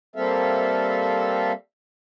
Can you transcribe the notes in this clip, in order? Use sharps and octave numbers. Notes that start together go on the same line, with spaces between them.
G3 A#3 C4 A4 E5 F5